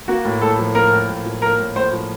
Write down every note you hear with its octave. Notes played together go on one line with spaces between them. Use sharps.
A#3 F#4
A2
A2 A4
F3
A#3 A#4
A2
A2
F3
A#3 A#4
A2
A2 C5
F3